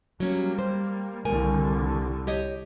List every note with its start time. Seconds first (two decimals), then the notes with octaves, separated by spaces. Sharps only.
0.20 F#3 G3 A#3 C#4
0.59 C5
1.25 C2 D3 D#3 G3 A#4 G#5
2.27 G4 C#5 D#5